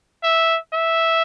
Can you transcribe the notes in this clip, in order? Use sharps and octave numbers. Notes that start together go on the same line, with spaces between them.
E5
E5